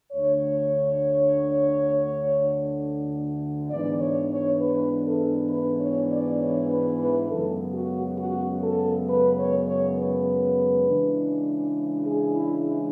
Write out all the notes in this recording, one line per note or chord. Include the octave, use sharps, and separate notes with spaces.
D2 D3 A3 D4 C#5
G#2 E3 B3 D4 D5
C#5
C#5
B4
A4
B4
C#5
D5
C#5
B4
B4
F#2 C#3 G#3 B3 A4
F#4
F#4
A4
B4
C#5
C#5
B4
C#3 E3 G#3 D4
G#4
E4